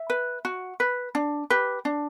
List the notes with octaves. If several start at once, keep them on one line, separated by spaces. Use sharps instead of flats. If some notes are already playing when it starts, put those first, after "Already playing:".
Already playing: E5
B4
F#4
B4
D4
G4 B4
D4